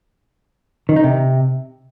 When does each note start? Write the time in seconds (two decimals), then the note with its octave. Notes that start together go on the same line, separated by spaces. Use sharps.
0.89 D#3
0.96 D#4
1.04 C3